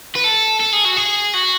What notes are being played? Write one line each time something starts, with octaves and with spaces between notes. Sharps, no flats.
B4
A4
A4
G#4
F#4
G#4
F#4